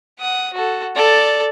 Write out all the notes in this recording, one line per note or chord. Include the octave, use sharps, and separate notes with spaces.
F#5 D#6
F#4 A4
A4 D5